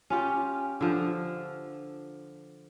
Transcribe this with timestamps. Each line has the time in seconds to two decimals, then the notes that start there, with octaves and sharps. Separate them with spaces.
0.10 C#4 F4 G4
0.81 D3 F3